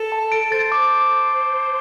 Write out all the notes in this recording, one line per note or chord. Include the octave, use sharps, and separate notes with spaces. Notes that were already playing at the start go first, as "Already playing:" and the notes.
Already playing: A4
A5
D7
C5 A6
D6